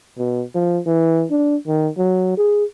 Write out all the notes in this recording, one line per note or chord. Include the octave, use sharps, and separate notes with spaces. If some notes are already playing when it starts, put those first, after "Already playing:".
B2
F3
E3
D4
D#3
F#3
G#4